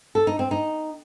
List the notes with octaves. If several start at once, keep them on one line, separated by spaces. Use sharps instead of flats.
A4
D#4
C4
D#4